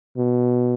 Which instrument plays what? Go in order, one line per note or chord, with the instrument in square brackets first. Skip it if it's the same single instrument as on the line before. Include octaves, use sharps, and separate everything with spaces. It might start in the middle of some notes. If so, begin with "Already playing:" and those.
[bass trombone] B2